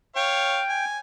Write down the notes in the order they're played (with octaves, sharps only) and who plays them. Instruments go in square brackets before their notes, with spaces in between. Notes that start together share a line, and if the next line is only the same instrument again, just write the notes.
[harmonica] C#5 F5 [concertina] G5
[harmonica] G#5